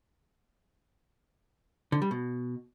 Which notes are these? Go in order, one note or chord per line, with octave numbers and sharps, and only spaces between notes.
D3
G3
B2